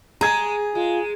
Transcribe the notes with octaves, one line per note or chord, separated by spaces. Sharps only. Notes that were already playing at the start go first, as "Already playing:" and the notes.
G#3 G#4 A#5 G#6 D#7
G#3 F4